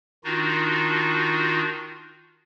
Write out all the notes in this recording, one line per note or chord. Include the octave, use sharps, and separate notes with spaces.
D#3 D4 D#4 F4 F#4